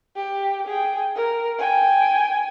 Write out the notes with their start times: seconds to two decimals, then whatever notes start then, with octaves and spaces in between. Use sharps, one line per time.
0.16 G4
0.67 G#4 G5
1.16 A#4
1.59 G5 G#5